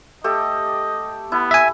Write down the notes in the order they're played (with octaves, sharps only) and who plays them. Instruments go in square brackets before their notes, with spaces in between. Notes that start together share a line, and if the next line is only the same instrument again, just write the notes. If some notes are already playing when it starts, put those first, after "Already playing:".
[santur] A3 G4 A4 [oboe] D#5
[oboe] B3 [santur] E4
[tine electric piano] E5 G#5